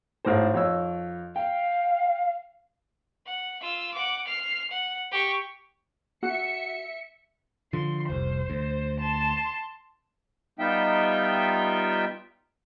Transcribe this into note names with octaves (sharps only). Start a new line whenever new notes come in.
G#1 A2 C5
F2 C#5 E6
F5 G5
F#5
F4 E6
F#5 D6
F6 C7
F#5
G4 C#6
F#4 E5 C#7
D3 F3 C6
F1 C2 C5
D2
A5 C6
G3 B3 D#4 F4 E5 G5